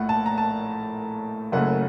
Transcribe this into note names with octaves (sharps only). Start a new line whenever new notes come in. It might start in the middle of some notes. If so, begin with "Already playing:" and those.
Already playing: A#1 A2 A3 F#5
A5
A#5
A5
F#1 F#2 C#3 A3 F#5